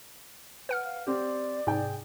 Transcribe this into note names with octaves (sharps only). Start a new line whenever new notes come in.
B4 F#5 F6
F5
C4 G4 D5
G#2 C3 G#4 G5